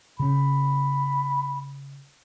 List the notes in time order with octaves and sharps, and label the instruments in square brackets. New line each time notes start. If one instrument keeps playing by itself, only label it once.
[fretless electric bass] C#3 C#4 [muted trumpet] B5